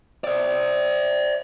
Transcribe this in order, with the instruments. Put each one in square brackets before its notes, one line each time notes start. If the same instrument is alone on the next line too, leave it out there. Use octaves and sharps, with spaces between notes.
[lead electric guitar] C5 D5